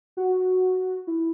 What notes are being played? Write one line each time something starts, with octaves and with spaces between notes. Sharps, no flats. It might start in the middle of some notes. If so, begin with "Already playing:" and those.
F#4
E4